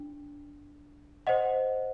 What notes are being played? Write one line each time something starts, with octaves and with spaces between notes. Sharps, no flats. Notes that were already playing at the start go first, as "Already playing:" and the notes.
Already playing: D4
C5 D#5 F#5